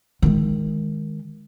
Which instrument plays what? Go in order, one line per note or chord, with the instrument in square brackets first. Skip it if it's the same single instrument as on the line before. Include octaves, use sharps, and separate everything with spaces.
[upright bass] D#3 G#3